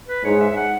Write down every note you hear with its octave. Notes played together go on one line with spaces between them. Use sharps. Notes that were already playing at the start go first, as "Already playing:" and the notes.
B4
G#2 C#5
E5
F#5